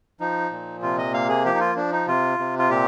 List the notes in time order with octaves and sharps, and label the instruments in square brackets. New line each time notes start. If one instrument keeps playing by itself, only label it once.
[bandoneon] F3 D#4
A#2
C3 F4
D#5
A#3 F5
G#4
F3 G4
D#4
F4
F3 D4
D#4
C3 F4
C3
F4
A#2 G4